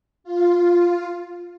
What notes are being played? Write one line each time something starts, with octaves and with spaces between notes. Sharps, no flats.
F4